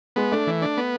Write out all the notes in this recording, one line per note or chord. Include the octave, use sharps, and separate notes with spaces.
G#3 B3
A3 D4
E3
D4
B3